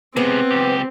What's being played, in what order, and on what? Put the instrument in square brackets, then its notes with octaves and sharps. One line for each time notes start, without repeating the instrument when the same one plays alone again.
[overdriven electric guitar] C3 G#3 [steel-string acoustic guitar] B3 [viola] C4
[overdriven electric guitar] C#2 G4